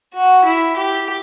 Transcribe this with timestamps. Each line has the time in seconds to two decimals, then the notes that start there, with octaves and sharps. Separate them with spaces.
0.14 F#4
0.44 E4
0.76 G4